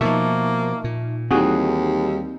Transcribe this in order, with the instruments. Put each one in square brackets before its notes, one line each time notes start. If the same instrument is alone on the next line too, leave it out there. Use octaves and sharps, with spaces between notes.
[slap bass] B2 F3 [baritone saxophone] A#3 [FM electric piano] D#4 [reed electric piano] E5 A5 C#6
[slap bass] A#2
[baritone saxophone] D#2 [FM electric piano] E3 G3 D#4 [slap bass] C4 [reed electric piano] F#4 G#4 D#6